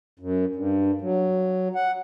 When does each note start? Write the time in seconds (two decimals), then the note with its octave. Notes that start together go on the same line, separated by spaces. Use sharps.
0.19 F#2
0.55 G2
1.01 F#3
1.75 F#5